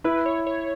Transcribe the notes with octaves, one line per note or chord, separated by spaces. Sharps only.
E4 B4
C#5
C#5